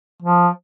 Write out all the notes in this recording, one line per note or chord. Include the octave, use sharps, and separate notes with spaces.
F3